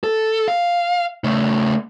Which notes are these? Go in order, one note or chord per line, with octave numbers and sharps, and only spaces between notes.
A4
F5
C#3 A3